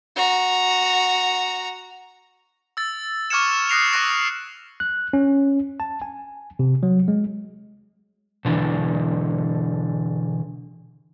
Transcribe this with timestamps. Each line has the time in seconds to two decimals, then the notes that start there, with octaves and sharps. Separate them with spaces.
0.16 F#4 A#5
2.77 E6 A6
3.30 C#6 D6 F6 G#6 C#7 E7
3.69 D#6 F#6 A#6 C7 D7 F7
3.93 C#6 D6 E6 F#6 A#6 D7
4.80 F#6
5.13 C#4
5.80 A5
6.02 G#5
6.59 C3
6.83 F#3
7.08 G#3
8.45 B2 D3 E3